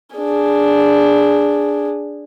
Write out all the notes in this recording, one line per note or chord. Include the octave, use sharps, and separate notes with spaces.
D4 G#4